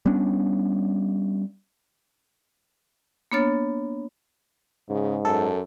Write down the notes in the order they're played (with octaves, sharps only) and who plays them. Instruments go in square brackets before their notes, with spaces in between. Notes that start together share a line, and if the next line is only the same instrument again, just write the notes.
[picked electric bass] G3 B3 C#4 D4
[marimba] A#3 B3 D4 C#5 F6 A6
[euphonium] G#2 [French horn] C#3
[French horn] F#2 [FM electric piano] A4